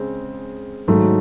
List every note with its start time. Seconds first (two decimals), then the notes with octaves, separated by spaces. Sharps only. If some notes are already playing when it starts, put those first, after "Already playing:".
Already playing: C#3 G#3 C4
0.88 G#2 D#3 F#3 A3